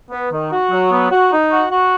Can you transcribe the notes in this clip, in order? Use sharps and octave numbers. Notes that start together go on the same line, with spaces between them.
B3
D#3
F#4
F#3
B3
F#4
D#4
F#4
F#4